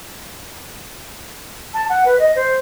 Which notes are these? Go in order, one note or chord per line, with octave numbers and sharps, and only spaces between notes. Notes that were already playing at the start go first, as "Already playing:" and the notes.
A5
F#5
B4
D#5
C5